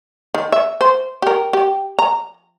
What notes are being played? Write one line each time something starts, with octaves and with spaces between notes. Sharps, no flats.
D#3
E5
C5
G4 A#4
G4
A#5